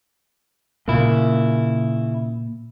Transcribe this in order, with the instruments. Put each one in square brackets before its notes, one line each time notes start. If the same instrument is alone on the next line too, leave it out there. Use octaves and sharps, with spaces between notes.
[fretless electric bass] A#2 A#3 [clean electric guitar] C#3 E4